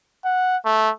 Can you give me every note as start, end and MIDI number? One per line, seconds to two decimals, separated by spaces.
0.24 0.57 78
0.65 0.90 57